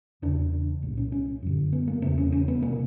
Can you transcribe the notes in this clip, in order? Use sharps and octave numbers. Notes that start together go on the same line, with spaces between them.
E2 C#3 D4
C2 A#2
C#4
C#4
F#2 D3
B3
A#3
E2 C#3 C4
C#4
C#4
B3
C3 A#3